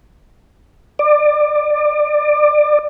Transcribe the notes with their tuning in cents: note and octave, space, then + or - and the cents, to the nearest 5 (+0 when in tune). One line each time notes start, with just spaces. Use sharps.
D5 +25